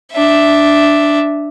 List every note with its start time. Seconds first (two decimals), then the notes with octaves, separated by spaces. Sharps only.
0.13 D4 E5